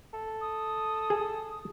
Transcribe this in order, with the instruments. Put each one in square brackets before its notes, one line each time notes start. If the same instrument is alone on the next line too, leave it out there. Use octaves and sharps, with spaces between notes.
[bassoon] A4
[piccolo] D#6
[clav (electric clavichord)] G#4